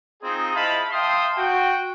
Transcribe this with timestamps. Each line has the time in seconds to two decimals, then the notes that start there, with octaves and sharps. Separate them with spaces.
0.22 C4 D#4 F4 G#4
0.55 E4 C5 D#5 F5 A5 B5
0.92 E5 F5 G5 A5 C6 D#6
1.37 F#4 G5